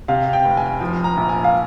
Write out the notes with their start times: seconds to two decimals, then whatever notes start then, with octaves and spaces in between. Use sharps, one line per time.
0.08 C3 F5
0.33 G5
0.45 F1
0.57 G#5
0.81 F3 G#5
1.04 A#5
1.17 A#1
1.29 G#5
1.44 F5